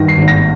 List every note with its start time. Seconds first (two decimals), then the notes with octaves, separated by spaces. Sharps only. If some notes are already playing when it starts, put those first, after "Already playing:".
Already playing: G2 D#3 A#6
0.08 C7
0.18 G#1
0.28 A#6